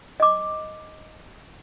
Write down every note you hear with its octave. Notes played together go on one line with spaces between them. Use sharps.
D#5 D6